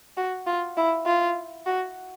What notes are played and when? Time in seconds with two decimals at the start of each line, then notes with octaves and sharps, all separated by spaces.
0.17 F#4
0.47 F4
0.77 E4
1.06 F4
1.66 F#4